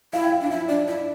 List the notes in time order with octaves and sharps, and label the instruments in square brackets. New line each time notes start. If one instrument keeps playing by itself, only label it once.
[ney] E4 [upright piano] F5
[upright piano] G5
F5
[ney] D4
[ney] E4 [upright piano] E5
[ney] D4 [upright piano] D5
[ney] E4 [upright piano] D5